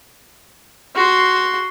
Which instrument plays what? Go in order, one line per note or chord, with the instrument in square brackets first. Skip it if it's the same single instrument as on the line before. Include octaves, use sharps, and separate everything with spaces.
[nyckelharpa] F#4 C6